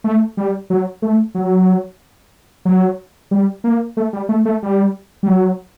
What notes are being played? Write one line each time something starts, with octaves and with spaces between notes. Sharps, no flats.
A3
G3
F#3
A3
F#3
F#3
G3
A#3
A3
G3
A3
A3
G3
G3
F#3